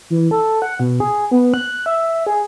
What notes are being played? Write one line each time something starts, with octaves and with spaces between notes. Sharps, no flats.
E3
A4
F#5
B2
G#4
B3
F#6
E5
G#4